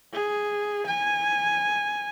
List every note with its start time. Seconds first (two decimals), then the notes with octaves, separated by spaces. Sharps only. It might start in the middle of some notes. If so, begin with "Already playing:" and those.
0.13 G#4
0.87 G#5